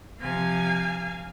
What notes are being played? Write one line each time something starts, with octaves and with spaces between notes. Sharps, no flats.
C3 F3 F5 G#5